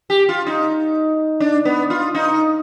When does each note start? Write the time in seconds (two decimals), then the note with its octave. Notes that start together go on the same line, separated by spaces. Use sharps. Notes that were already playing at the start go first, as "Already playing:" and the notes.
0.10 G4
0.29 F4
0.47 D#4
1.40 D4
1.65 B3
1.90 F4
2.15 D#4